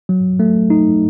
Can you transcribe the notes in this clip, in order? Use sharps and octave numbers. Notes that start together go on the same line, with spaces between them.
F#3
A3
D#4